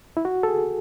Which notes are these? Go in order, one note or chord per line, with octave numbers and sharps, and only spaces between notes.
E4
F#4
A4
G#4